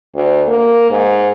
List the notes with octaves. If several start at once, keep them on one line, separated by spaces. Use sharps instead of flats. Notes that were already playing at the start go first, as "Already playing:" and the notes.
D2
A#3
G#2